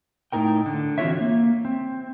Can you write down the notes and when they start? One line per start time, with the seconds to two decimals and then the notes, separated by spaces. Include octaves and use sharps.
0.32 A2 C#4 D#4 A#4 G5
0.66 D3
0.98 E3 C4 F4 F#4 C#5 E5
1.20 A#3
1.65 C4